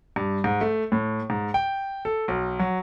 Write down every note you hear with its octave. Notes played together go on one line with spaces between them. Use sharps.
G2
G#2
A3
A2
G#2
G5
A4
B1
F#3